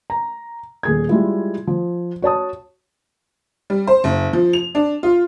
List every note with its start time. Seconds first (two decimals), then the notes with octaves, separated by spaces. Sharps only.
0.10 A#5
0.83 D#1 G#4 G#6
1.09 G3 G#3 E4 F4
1.67 F3
2.22 F#4 C#5 A5 D#6
3.70 G3
3.87 C5
4.04 F#1
4.33 F3
4.53 F7
4.75 D4
5.03 F4